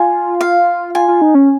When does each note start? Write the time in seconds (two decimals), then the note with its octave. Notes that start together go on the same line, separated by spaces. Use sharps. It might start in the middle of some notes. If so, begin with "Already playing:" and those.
Already playing: F4 G#5
0.41 F5
0.95 F4 G#5
1.08 F4
1.22 D#4
1.35 C#4